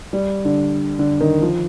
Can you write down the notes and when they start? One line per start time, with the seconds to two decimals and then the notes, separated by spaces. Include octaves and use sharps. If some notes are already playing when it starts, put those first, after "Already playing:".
0.13 G3
0.45 D3
0.99 D3
1.20 D#3
1.42 F3